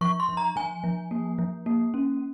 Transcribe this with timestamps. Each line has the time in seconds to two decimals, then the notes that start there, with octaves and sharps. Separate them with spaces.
0.01 F3 C#6
0.20 C6
0.29 F3
0.37 A#5
0.56 F3 G#5
0.84 F3
1.11 A#3
1.38 F3
1.66 A#3
1.94 C#4